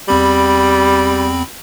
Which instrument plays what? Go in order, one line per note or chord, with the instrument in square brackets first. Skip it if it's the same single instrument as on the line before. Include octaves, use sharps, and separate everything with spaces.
[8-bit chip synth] E2 C4 B5 [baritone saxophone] G3